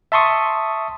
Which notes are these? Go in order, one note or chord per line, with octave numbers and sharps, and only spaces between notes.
E5 A5 C6 C#6 D#6